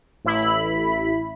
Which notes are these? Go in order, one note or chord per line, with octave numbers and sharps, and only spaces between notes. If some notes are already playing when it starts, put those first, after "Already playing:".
A1 E4 B5